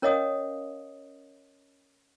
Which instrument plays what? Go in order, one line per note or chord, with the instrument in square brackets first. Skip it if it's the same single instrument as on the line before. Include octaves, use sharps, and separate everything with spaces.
[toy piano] C#4 A#4 C#5 D#5 F5 D#6